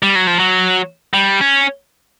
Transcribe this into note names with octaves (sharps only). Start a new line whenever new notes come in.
G3
F#3
F3
F#3
G3
C#4